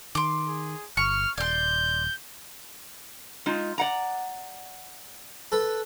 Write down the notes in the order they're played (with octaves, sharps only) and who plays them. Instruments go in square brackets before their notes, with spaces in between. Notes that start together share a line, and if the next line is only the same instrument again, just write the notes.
[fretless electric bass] D#3 [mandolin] C6 D6
[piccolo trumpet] G#4
[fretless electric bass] G1 [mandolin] C#6 [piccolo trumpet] F6
[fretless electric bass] D#1 [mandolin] D5 C6 [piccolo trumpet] G6
[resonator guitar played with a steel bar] G#3 D#4 F4
D5 F#5 A#5
[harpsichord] A4 B4